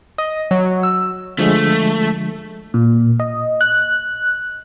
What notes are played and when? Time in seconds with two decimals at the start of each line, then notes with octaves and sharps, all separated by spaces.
0.18 D#5
0.51 F#3
0.83 E6
1.39 D3 F3 G#3 A3
2.74 A#2
3.20 D#5
3.61 F#6